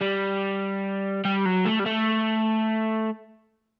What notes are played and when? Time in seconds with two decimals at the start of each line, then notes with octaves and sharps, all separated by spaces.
0.01 G3
1.25 G3
1.46 F#3
1.65 A3
1.80 G3
1.86 A3